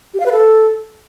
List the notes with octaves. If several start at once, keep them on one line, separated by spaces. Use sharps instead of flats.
G4
F5
B4
A4